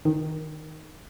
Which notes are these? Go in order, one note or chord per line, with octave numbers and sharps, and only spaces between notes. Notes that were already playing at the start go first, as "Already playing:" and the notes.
D#3